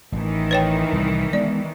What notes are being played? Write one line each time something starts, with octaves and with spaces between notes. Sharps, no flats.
A1 A2 D#3 E3
B4 C#5 G5
C2 A2
G#3 B3 D5